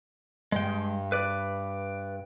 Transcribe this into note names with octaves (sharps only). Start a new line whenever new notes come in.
G2 G#3 G5
B4 D5